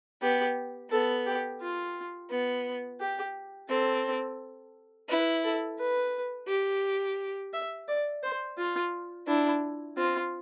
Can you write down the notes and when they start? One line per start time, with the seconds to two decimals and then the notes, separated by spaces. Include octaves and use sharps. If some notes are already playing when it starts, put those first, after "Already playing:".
0.22 B3 G4
0.91 B3 A4
1.26 G4
1.61 F4
2.30 B3
3.00 G4
3.69 C4 A4
5.09 E4 B4
5.44 A4
5.79 B4
6.48 G4
7.53 E5
7.88 D5
8.23 C5
8.58 F4
9.27 D4 E4
9.97 C4 F4